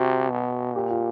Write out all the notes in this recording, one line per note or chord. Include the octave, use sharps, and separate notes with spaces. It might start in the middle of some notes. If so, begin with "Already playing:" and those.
Already playing: C3 F#4
B2
A#2 G4
F4